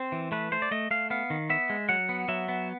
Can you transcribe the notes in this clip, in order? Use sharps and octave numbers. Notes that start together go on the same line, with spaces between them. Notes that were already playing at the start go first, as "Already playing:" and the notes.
Already playing: C4 C5
E3
A3 B4
A3 C5
D5
A3 D#5
A3 F5
B3 F5
D#3
B3 E5
G#3
F#3 F#5
B3
F#3 E5
B3